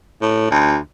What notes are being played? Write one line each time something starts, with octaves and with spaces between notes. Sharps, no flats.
A2
D2